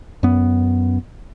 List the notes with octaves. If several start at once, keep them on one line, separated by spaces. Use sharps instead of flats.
F#2 B3